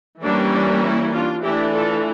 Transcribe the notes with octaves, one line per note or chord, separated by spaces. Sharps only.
E3 G3 A#3 C#4 D4
D4
E4
D4 F4
E3 A3 D4 E4 G4
F4 A4